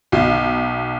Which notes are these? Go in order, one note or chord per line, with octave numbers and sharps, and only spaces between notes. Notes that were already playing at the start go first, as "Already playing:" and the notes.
B1